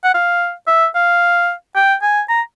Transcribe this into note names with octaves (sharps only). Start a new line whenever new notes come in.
F#5
F5
E5
F5
G5
G#5
A#5